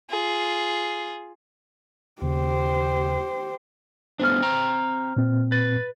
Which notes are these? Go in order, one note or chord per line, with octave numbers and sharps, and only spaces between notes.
F4 G#4
D#2 C#3 G4 C5
A3 B3 D4 C5 F6
C4 G5 A#5
A#2 C4
B4 A6